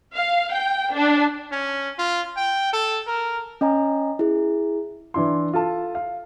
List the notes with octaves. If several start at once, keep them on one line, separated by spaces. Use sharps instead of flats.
F5
G5
D4
C#4
F4
G5
A4
A#4
C#4 D#5 G#5 A#5
E4 G#4
E3 D4 E4 C6
F4 A4 A5
F5